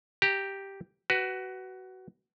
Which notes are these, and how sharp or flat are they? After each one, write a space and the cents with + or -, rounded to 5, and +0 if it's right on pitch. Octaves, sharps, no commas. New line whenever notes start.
G4 +0 A#5 +0
F#4 +20 B4 +0